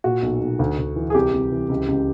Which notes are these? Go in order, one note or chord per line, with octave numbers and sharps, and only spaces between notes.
A#2 F#4
B1
B1
D2
D2
E3
G#4
C2 G4
C2
E3
C#2
C#2